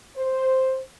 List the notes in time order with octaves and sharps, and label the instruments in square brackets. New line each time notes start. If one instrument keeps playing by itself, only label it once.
[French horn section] C5